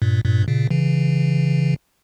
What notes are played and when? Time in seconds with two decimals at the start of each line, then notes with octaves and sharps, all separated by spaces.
0.02 G2 A#2
0.24 G2 A#2
0.47 A#2 C#3
0.71 C#3 E3